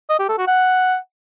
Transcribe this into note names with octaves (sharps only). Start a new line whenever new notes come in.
D#5
G4
A4
F#4
F#5